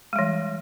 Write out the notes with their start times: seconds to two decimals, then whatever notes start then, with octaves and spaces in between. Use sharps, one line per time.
0.13 G#3
0.16 G3
0.19 E3